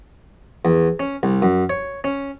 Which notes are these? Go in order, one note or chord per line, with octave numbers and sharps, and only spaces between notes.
E2
C#4
C2
F#2
C#5
C#4